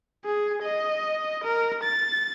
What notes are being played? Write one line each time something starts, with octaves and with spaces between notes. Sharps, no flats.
G#4
D#5
A#4
A6